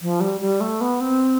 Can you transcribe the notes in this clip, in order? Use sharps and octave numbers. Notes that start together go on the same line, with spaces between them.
F3
G3
G3
A3
B3
C4